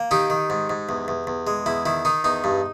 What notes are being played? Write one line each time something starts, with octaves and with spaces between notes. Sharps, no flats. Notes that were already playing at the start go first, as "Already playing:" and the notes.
Already playing: A#3
D#3 D#4 G4
D#3
G#2
G#2
E2
E2
E2
G#3
E2 E4
D#3 E4
D#3 D#4
E2 D#4
G2